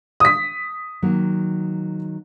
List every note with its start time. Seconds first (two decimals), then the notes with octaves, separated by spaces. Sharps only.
0.20 D#6 B6
1.02 D#3 F#3 A#3